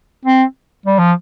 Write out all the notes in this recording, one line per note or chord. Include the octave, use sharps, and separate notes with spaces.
C4
G3
F3